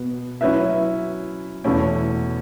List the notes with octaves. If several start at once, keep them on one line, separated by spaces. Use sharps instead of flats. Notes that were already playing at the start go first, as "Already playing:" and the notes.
Already playing: B2 B3
F#3 C#4 E4 B4 E5
E2 B2 A3 C#4 E4